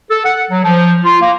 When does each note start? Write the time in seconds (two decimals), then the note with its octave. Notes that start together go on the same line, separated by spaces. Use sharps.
0.11 A4
0.25 F#5
0.50 F#3
0.64 F3
1.04 F4
1.21 A#3